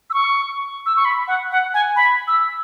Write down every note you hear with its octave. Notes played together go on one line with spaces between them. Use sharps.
E6
C#6
E6
C#6
B5
F#5
F#5
G#5
B5
E6